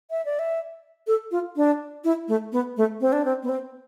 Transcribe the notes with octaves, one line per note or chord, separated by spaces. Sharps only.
E5
D5
E5
A4
F4
D4
E4
A3
B3
A3
C4
D4
C4
B3
C4